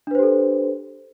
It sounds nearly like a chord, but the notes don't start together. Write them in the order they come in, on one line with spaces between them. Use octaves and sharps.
D4 B4 C5 G4 A4